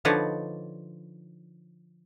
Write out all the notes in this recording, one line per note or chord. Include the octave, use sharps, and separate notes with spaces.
D3 F3 D#4 B4 C#5 D5